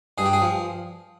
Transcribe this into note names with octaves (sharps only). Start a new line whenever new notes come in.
G2 G#4
G4
G#4
F3